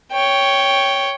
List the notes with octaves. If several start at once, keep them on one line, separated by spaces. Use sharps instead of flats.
C#5 G5